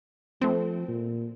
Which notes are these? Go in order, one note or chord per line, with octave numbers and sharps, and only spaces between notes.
F3 A3 C4
A#2